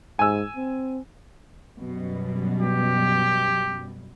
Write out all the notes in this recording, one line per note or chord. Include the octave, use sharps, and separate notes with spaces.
G#2 G#5 E6
C4
F#2 B2 G3
G4